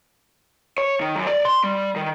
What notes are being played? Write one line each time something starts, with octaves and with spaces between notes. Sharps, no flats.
C#5
D#3
F#2
D5
C6
G3
D#3